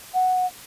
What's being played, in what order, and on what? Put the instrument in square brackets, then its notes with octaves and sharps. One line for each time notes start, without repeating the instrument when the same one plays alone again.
[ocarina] F#5